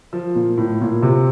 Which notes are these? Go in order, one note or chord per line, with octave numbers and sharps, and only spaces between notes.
F3
A#2
A2
A#2
C3